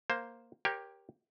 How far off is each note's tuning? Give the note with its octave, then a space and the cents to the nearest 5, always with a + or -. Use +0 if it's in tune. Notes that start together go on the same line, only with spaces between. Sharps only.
A#3 +0 C5 +5
G4 +5 A#4 +15 C#5 -20